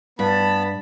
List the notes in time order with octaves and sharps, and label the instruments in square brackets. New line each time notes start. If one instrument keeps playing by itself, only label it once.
[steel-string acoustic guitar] G2 [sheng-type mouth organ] B3 B5 [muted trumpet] A5